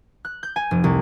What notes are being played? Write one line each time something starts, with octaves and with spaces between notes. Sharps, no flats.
F#6
G6
G#5
F1
C2